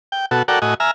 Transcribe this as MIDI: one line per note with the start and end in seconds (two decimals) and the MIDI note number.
0.12 0.26 79
0.31 0.43 47
0.31 0.43 66
0.31 0.43 69
0.48 0.59 66
0.48 0.59 69
0.48 0.59 70
0.48 0.59 74
0.48 0.59 78
0.48 0.59 79
0.62 0.74 45
0.62 0.74 66
0.62 0.74 75
0.62 0.74 80
0.80 0.91 76
0.80 0.91 80
0.80 0.91 82
0.80 0.91 89